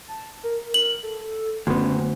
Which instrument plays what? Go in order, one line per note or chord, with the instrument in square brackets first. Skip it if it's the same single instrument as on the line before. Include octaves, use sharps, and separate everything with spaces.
[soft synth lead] A5
A#4
[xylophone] F#7
[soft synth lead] A4
[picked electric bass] F#1 B3 [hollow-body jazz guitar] D2 [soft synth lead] C#4